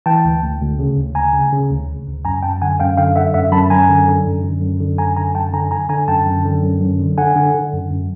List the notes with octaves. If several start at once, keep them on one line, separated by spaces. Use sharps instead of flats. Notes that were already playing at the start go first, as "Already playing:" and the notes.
E3 G5 A5
D2
D2
D2
C#3
D2
D2 G#5 A#5
C#3
C#3
D2
C#3
D2
F#2 G#5 A#5
F#2 G5 A5
D3 F#5 G#5
F#2 F5 G5
D3 F5 G5
D3 E5 F#5
F#2 E5 F#5
F#2 A5 B5
F#2 G#5 A#5
D3
D3
F#2
D3
F#2
D3
F#2 G#5 A#5
D3 G#5 A#5
F#2 G5 A5
D3 G#5 A#5
D3 G#5 A#5
D3 G#5 A#5
F#2 G5 A5
F#2
D3
F#2
F#2
D3
D3 F#5 G#5
D3
D3
F#2
F#2